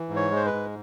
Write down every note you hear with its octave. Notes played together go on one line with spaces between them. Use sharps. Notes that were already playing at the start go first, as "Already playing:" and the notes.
Already playing: E3
G#2
C#5
G#3
C5
B4
G#2